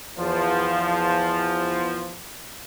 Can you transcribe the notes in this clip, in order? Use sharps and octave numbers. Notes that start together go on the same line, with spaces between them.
E2 F3